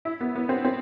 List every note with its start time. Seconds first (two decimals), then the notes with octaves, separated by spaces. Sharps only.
0.05 E4
0.20 B3
0.35 B3
0.49 C4
0.65 C4